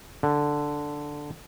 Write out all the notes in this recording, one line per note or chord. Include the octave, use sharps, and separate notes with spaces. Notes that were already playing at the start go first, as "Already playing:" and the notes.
D3